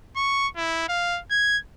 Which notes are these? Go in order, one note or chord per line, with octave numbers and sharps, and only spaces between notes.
C#6
E4
F5
G#6